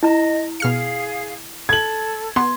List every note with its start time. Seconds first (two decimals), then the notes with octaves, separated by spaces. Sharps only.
0.03 E4 D#5 A#5
0.60 B2 G#4 F5 F6 C#7
1.69 A4 G#6 F#7
2.36 B3 C6